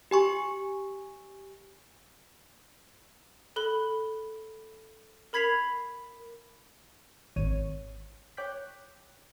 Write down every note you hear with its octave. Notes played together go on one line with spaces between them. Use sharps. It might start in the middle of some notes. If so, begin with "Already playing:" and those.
G4 G#5 C#6
A4 B5 F#6 G7
A#4 B5 G#6 B6 C7 F7
G#1 C#5 D#7
C#5 G5 D6 F#6 G6 B6